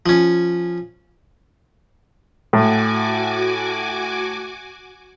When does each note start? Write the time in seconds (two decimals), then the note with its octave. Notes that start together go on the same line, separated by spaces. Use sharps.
0.06 F3 C#4
2.53 A2 F#4 G#5 D6